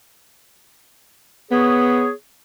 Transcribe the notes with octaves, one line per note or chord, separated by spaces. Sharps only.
B3 G#4 C#5